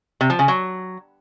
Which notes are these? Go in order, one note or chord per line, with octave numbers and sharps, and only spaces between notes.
C3
F3
C#3
F#3